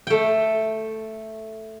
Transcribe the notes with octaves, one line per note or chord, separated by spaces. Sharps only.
A3 G5